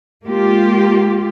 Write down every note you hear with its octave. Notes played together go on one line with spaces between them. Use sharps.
G#3 A#3 F4 G4